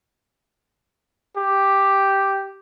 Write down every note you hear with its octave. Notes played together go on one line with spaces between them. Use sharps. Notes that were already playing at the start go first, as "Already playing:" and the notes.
G4